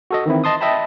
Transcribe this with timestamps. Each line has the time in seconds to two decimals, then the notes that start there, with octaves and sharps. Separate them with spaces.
0.11 F#4 A4 D#5
0.26 D#3 E3 C4 E4
0.44 D#5 A5 C6 D#6
0.61 D#5 E5 G5 A5 B5